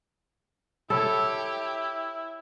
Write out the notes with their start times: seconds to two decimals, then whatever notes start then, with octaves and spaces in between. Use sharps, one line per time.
0.90 E4 G4 A4 C#5 A5 B5